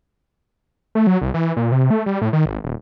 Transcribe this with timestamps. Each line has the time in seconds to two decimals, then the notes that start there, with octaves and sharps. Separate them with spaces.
0.95 A3
1.07 F#3
1.22 C2
1.34 E3
1.57 A#2
1.72 C3
1.90 A3
2.06 G3
2.21 A2
2.33 D#3
2.46 G#1
2.64 D#1